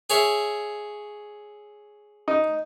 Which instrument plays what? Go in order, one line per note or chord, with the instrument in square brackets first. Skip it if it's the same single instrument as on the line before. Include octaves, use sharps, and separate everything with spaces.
[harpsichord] G#4 C#5 E5
[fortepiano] D#4